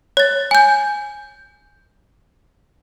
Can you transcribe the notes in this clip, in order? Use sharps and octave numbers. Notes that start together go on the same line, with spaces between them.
C#5 A6
G#5 G6